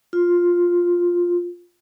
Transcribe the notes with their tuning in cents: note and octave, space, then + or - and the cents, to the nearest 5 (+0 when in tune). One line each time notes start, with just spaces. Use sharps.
F4 +5